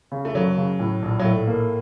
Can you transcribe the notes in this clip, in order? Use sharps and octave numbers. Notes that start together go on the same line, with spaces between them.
C#3
A3
F#1 F#3
C#3
A2
A#1
F#3
A2 A3
A#3